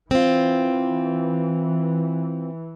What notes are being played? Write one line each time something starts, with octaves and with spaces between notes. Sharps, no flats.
E3 C4 F4